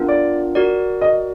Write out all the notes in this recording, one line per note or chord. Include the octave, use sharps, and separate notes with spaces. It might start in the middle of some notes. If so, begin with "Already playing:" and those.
Already playing: B3 D4 F4 A#4
D5
F#4 A#4 D5
D#5